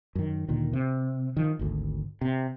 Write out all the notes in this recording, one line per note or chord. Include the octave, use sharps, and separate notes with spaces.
F#2 D#3
D2 A#2 D3 D#3
C3
D#3 F3
G#1 D2
C3